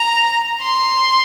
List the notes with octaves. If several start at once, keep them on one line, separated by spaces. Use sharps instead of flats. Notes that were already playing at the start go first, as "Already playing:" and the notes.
Already playing: A#5
C6